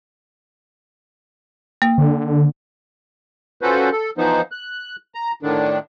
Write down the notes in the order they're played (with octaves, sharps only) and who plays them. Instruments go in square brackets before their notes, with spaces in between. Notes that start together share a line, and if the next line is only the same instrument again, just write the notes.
[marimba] A#3
[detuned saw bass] D3
[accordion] C#4 F4 F#4 A4 B4 C5
A4
E3 F3 B3 D#4 C5
F#6
A#5
A2 D3 D#3 D4